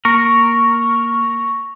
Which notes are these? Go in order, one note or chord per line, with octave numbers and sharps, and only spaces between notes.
A#3 A#4 C#6